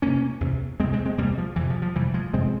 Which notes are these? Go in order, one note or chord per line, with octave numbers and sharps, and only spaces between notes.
E2 C3 A#3 C#4
E2 C3
E2 C3 G#3 C4
G#3 C4
G#3 C4
E2 C3 G3 A#3
F3
F2 C3 E3
F3
F3
F2 C3 E3 G3
F3 G#3
F2 C3 G#3 C4